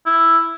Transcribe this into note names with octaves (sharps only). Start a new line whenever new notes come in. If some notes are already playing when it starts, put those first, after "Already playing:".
E4